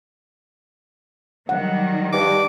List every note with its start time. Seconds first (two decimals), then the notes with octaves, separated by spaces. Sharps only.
1.49 D#3 F#3 G3 F#5
2.13 G2 D6